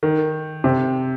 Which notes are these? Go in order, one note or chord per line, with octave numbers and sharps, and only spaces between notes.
D#3
C3